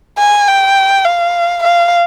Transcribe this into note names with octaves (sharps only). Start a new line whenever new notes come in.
G#5
G5
F5
F5